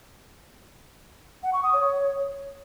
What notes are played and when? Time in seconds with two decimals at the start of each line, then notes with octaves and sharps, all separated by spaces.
1.43 F#5
1.53 C#6
1.63 D#6
1.73 C#5